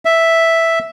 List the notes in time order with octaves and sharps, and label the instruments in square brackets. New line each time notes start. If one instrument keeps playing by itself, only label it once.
[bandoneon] E5